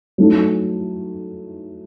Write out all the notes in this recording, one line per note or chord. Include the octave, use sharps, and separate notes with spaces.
F#3 A3 D#4 A4